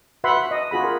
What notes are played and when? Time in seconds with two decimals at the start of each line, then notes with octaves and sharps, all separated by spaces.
0.24 F#4 B4 E5 F#5 B5 C6
0.37 F#4
0.51 D#5
0.71 F4 F#4 G#4 B5
0.84 A#4